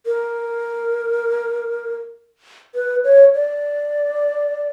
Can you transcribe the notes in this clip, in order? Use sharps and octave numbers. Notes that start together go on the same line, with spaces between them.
A#4
B4
C#5
D5